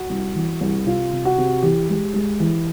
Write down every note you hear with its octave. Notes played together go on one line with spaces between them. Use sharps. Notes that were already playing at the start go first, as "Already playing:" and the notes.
Already playing: F#4
C2
E3
C2
C3 F4
C3
F#4
C3
E3 G4
G#3
G#3
E3